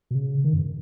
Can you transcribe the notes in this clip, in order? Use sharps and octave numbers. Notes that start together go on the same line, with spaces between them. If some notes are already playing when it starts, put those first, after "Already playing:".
B2
C#3
D#3
F#2